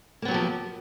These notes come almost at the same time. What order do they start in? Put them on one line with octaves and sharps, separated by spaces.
A#3 B3 F#3 G4 F3